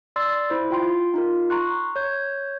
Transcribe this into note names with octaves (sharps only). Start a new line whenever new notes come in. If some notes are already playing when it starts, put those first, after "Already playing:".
D5 C6 E6 A6
E4 C5
F4 G5 C6
D#4 F4 A#4
A#5 C6 C#6 F#6
C#5 G6